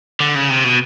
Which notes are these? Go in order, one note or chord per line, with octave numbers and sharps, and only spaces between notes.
D3
C#3
C3
B2